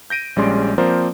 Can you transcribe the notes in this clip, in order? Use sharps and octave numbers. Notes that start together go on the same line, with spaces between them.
G6 A#6 D7 D#7
A#1 G3 G#3 C#4 D5 C6
F3 A#3 C4 A#4 C5 D5